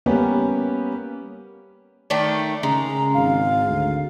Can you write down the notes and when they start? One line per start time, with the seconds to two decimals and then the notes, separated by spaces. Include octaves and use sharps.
0.06 G3 A#3 B3 C#4 G4
2.10 D#3 A3 D5
2.63 C#3 G#3 A#5
3.14 G#1 F5
3.67 D2